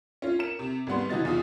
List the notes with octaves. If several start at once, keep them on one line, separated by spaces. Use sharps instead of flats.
C#4 F4
A#4 C#7 E7
C3
G#1 G3 B3 C6
E3 D#4 F#4 D#5 A6
E2 F4 D#6